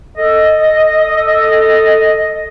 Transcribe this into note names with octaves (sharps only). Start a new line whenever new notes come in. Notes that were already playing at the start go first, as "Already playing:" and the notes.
A4 D#5